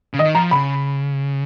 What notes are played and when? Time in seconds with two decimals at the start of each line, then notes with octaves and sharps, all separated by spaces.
0.14 C#3
0.19 D#3 D#5
0.35 F3 A#5
0.51 C#3 B5